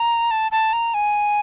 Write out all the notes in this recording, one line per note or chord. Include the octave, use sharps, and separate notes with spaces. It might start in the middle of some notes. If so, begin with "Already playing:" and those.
Already playing: A#5
A5
A5
A#5
G#5